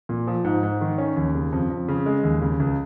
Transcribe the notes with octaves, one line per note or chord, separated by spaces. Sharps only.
A#2
F3
G#2
G#2
D#3
C#4
D#2
C#3
F2
F2
C#3
G#3
D#2
C#3
C#2